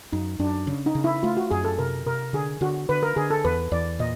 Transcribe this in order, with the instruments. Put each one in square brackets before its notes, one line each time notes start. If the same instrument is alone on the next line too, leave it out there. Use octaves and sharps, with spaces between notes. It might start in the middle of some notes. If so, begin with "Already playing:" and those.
[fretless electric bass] F#2 [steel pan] D#4
[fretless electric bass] F#2 [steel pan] D4
[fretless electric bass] C#3
[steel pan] D#4
[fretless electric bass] C#3
[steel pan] E4
[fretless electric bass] A3 [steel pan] F4
[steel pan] F#4
[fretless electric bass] F#2 [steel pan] G#4
[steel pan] A4
[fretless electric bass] C3 [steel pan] A#4
[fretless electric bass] C3 [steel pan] A#4
[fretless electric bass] D3 [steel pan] G#4
[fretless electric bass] D3 [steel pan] F#4
[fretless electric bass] D3 [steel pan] B4
[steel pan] A#4
[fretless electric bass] D3 [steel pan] G#4
[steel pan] A4
[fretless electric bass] E2 [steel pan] B4
[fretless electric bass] E2 [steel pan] D5
[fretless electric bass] A#2 [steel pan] D#5